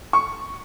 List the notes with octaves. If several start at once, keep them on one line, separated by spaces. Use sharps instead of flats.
C#6